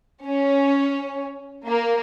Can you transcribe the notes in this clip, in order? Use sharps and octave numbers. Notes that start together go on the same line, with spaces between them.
C#4
A#3